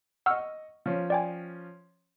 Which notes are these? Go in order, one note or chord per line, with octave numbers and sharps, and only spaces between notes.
D#5 F#5 C#6 E6 F6
F3 C#4
D5 G5 G#5